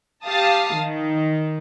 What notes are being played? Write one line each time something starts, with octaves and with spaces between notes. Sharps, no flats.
G4 F5 A5 D#6
D#3